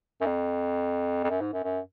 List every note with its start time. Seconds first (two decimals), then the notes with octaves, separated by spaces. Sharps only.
0.21 F#2
0.26 F2
1.24 F2
1.30 F#2
1.41 G#2
1.53 F#2
1.64 F#2